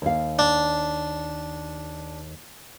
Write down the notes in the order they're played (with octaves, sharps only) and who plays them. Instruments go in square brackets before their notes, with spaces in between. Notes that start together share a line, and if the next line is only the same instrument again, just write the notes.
[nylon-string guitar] D#2 F5
[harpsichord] D4